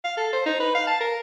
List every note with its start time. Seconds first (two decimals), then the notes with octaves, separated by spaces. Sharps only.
0.04 F5
0.17 A4
0.33 C5
0.46 D#4
0.60 B4
0.75 F5
0.87 A5
1.00 A#4